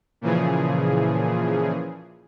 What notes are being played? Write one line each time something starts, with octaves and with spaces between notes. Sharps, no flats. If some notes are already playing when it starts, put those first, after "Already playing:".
A#2 C#3 E3 F3 G#4